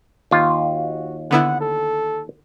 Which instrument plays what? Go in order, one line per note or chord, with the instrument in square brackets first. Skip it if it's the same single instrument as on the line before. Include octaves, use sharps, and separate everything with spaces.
[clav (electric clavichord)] D#2 F4
[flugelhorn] F#4
[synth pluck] D3 B3 E4 [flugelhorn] F#5
[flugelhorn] A4